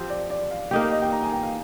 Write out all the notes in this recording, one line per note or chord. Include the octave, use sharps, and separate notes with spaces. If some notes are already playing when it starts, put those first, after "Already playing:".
Already playing: F3 C4 G4 C5
D5
D5
F5
A#3 D#4 G4 G5
F5
D#5
G5
A#5
G#5
G5
F5